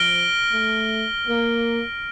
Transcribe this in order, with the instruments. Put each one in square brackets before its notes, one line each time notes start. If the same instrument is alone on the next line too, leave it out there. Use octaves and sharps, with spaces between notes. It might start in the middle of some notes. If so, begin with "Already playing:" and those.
Already playing: [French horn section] F3 [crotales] F6 A#6 D7 G7
[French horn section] A3
A#3